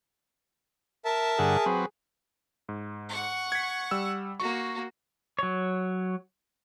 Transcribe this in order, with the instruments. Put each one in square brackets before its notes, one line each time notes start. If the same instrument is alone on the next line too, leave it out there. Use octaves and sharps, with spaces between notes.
[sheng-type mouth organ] A#4 E5 A5
[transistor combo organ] G2 D3 F#5 [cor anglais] G#4
[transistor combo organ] F#3 C4 B4
[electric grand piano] G#2
[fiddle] F#5 C#6
[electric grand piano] G#6 B6
G3 E6
[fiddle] A#3 F#4 [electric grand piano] C#6
[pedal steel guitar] F#3 C#5